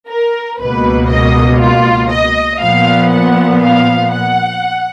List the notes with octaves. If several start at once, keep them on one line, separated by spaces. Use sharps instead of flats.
A#4
C#2 B2 A#3 B4
D#5
F4
D#5
A#2 F3 B3 F5
F#5
F5
F#5